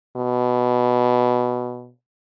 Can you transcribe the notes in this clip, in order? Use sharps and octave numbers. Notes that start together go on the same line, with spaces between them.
B2